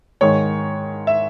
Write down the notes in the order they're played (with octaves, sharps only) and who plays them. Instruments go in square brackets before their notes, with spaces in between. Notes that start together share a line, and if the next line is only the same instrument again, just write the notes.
[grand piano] G#2 D#3 G#3 C#5
E5